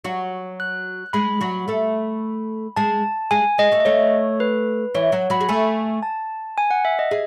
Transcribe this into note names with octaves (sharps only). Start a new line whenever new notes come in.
F#3 F#4
F#6
G#3 G#4 B5
F#3 F#4
A3 A4
G#3 G#4 A5
G#3 G#4 G#5
G#3 G#4 D#5
A3 A4
D#5
A3 A4 C#5
B4
E3 E4 C#5
F#3 F#4
F#3 F#4 B5
G#4
A3 A4 G#5
A5
G#5
F#5
E5
D#5
G#4